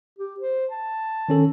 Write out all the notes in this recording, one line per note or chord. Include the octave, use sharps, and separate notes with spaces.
G4
C5
A5
D#3 C#4 A4